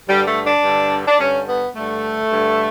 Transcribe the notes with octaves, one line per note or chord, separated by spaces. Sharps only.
G2 D3 G3
A3
D4
G2 D3
D4
G2 D3 C#4
B3
G2 D3 A3
G2 D3